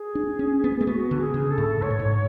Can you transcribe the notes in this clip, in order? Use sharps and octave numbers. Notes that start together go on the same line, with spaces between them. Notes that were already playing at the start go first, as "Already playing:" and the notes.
Already playing: G#4
D4
C#4
B3
A3
B3 F#4
D3
G#4
C#3
A4
A2
G#2 C#5
A2
G#2